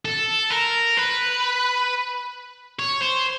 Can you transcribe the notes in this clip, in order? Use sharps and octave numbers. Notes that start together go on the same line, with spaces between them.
A4
A#4
B4
C#5
C5